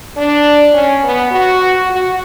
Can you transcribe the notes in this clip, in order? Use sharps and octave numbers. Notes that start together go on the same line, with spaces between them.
D4
C#4
B3
F#4
F#4